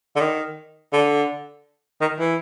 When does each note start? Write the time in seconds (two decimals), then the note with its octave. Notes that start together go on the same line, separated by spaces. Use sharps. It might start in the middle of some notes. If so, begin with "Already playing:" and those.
0.16 D3
0.21 D#3
0.93 D3
2.01 D#3
2.19 E3